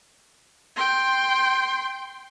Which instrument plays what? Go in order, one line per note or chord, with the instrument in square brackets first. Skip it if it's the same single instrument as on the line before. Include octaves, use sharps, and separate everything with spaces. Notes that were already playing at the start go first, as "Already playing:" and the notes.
[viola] G5 C6